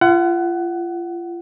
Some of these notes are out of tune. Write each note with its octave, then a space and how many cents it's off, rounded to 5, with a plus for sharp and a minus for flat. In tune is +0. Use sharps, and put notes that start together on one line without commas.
F4 -30 F#5 +20